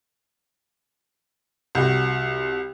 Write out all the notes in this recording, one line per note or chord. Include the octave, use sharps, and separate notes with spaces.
C2 F#4